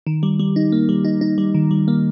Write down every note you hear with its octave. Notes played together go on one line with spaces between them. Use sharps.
D#3
G3
G3
D#4
A#3
G3
D#4
D#4
G3
D#3
G3
A#3